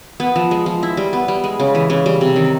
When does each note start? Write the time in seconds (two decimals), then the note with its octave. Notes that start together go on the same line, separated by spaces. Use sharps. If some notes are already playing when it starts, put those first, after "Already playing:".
0.20 B3
0.36 F3
0.51 G#3
0.66 F3
0.83 E4
0.97 G3
1.13 B3
1.28 G3
1.44 G#3
1.60 C#3
1.75 E3
1.90 C#3
2.06 G3
2.21 C3
2.36 D#3